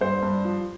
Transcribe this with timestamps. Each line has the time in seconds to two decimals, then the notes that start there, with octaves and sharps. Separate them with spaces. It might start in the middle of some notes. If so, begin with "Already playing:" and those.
0.01 G2 C5
0.23 G2
0.45 F3